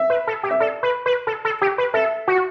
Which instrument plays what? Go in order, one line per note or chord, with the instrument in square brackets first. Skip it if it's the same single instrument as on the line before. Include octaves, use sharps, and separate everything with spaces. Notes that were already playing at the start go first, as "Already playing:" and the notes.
Already playing: [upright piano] E5
[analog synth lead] B4
A4
G4
[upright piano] E5
[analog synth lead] A4 [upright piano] D5
[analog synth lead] B4
B4
A4
A4
G4
B4
[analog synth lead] A4 [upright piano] E5
[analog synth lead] F#4